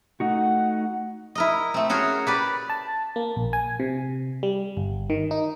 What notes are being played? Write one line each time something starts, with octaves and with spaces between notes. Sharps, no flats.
A3 D#4 F#4 F#5
E4 A#4 D#5
A3 C4
C#4 F#4 G#4 A#4 C#5
G4 B4 D5
A5
A#3
A#1
G#5
C3
G3
G1
D#3
D#4